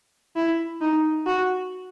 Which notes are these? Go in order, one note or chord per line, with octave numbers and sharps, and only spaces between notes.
E4
D#4
F#4